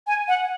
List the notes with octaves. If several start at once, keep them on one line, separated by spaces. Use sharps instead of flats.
G#5
F#5